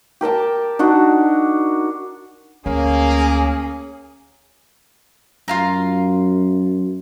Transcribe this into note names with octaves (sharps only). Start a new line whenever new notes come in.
G4 A#4 G5 A5
D4 D#4 F#4
D2 A#3 C#4 G#4
F#2 F4 F5 A#5